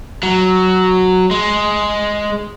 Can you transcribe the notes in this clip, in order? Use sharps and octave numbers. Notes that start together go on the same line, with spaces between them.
F#3
G#3